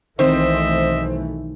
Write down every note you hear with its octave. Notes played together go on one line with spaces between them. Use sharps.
B1 D#3 E3 A3 C4 C5 D#5 E5